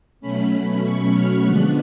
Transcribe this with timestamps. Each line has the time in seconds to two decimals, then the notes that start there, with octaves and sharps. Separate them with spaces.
0.20 B2 F#3 A3 C#4 B5
0.82 C#6
1.13 F6
1.43 D3 F3 G#3 B3 D4 F#6